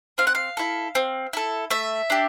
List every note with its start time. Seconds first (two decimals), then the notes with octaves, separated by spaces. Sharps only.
0.18 C4 F5
0.27 F#5
0.35 F5
0.57 E4 A4
0.95 C4
1.33 E4 A4
1.70 A3 E5
2.10 D4 G4